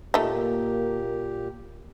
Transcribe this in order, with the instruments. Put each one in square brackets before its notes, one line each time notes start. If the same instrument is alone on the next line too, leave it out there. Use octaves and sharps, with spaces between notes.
[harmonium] A#2 G4 [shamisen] A3 D#4 [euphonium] A#3